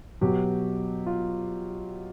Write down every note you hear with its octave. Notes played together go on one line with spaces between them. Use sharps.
B2 F#3 G4
F4